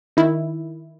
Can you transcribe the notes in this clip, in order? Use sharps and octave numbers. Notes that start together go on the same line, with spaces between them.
D#3 E4